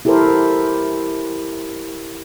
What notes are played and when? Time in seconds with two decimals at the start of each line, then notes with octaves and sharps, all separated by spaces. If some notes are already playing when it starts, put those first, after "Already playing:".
0.05 E4 G4 A4 A#4 C5